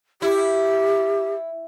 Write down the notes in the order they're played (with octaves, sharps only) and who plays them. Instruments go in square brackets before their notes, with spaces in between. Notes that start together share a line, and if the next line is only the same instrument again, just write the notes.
[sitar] E4 [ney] G4